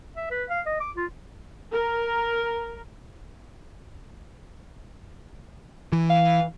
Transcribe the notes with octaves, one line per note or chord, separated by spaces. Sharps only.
E5
B4
F5
D#5
D6
F4
A#4
E3
F5